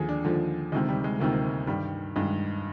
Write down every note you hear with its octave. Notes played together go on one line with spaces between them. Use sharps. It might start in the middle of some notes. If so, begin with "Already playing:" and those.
Already playing: D#2 D3 F3 G#4
D4
D#2 D3 F3
D2 C3 D#3 G#3
G3
G#3
D2 C3 D#3 A#3
G2 D#3 G3
G2 D#3 G#3